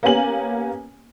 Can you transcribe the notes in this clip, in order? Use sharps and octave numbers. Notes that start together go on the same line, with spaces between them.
A#3 B3 C#4 G4 G#5 F#7